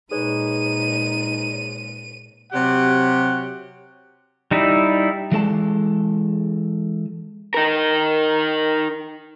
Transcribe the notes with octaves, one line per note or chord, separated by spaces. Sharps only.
A#2 G#3 D#4 G#4 B4 C#5 D#7
C3 F#3 G4 C#5 F#5
G3 D#4 E4
E3 G#3 A4 A5
D#4 A#4